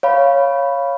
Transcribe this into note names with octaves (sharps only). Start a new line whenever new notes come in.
C#5 F5 B5